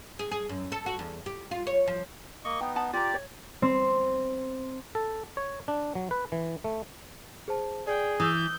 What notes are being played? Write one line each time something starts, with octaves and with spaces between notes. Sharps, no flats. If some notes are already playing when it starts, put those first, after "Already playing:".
G#4
G#4
F#2
A4
F#4
E2
G4
F4
C#5
F3
A#3 D#5 C#6
B3 D#4 G5
F#5 A5 B5
F4 G4 D5 A#5
C#5
C4
A4
C#5
D4
F#3
B4
E3
A3
G#4 C5 A5
G#4 D5 G5
E3 D#6 E6 G6